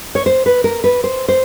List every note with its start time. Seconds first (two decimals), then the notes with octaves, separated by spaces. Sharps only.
0.15 C#5
0.26 C5
0.46 B4
0.64 A#4
0.84 B4
1.04 C5
1.28 C5